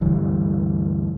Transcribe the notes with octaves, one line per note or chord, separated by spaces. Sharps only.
D2 G2 E3 G3